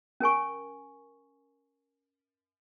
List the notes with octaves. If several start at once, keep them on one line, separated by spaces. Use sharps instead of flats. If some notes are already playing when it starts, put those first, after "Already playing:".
C#4 A#4 G#5 C#6